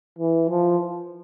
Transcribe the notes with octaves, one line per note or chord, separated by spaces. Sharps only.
E3
F3